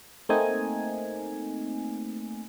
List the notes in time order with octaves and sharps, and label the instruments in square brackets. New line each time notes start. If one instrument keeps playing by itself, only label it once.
[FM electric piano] A3 A#3 C4 D#4 G#5